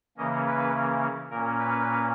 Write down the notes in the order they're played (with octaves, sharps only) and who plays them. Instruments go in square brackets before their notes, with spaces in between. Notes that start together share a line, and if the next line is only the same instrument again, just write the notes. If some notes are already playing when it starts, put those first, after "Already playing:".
[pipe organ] C#3 E3 A#3 C#4 D#5
B4
A#2 A#3 C#4 A#4
B4